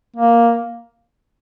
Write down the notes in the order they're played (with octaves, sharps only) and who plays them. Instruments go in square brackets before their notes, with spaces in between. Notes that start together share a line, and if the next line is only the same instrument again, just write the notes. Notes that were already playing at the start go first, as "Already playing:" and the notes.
[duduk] A#3